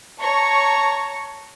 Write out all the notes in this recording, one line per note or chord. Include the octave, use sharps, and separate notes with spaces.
C#5 A5 A#5 C#6